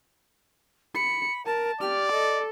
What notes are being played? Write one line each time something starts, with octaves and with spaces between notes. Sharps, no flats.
B5 C#7
A#4 A5
G4 D5 F6
A4 D#5